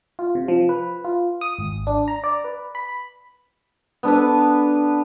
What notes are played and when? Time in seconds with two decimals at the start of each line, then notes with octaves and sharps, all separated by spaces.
0.19 F4
0.35 C3
0.48 F3
0.69 B4
1.04 F4
1.41 D#6
1.59 G#1
1.87 D4
2.08 A#5
2.24 D5
2.44 B4
2.75 B5
4.03 B3 D4 A4 B4